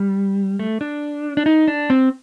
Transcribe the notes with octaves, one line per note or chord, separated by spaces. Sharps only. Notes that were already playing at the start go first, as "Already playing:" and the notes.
Already playing: G3
A3
D4
D4
D#4
D4
C4